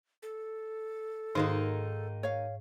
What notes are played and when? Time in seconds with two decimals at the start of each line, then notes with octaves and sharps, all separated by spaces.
0.23 A4
1.35 G#2 D#3 A#3 D#4 F#4 C5
2.23 C#5 F5